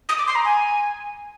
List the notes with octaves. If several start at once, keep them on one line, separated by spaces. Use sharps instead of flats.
D#6
D6
C6
A#5
G#5